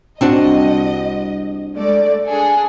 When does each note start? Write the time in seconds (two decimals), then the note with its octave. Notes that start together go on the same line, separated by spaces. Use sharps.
0.21 C2 C4 D4 F#4 D#5
1.76 G#3 A3 D5
2.28 D4 G#4 A4